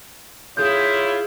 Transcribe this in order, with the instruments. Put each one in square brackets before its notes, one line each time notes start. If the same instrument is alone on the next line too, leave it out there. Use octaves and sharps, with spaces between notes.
[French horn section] E4 F4 C#5 [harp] G#4 G6